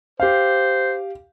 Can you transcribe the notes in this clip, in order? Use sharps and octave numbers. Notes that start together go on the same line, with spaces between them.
G4 C5 F5